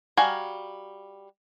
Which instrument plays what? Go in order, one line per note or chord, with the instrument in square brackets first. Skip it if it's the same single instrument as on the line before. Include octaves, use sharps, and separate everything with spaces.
[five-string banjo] G3 F#4 F5 G#5 A#5